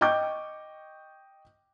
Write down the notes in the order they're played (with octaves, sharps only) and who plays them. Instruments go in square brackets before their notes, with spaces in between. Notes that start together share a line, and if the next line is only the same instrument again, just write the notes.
[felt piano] D#5 G5 C#6 D6 G6